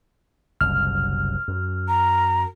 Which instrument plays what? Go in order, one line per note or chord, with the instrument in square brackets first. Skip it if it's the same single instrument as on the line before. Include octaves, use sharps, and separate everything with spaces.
[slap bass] F#1 C2 B2 [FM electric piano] F6
[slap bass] F#2
[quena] A#5